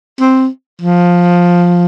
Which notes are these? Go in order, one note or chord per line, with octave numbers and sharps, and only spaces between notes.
C4
F3